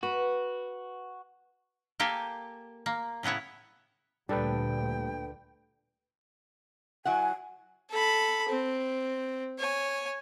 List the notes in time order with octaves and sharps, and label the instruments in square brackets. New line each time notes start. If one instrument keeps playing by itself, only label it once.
[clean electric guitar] F#4 [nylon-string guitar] B4
[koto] A#3 G4 A4 G#5
A#3
A2 C#3 B3 E4 C#5
[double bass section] D2 A#2 [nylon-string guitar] G3 [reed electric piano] D4 A4 B4 [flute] G5
[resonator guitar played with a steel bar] F#3 E4 F#5 [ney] G#5
[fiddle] A4 B5
C4
C#5 G#5